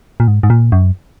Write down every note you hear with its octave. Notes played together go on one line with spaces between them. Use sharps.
A#2
G#2
G#2
A#2
F#2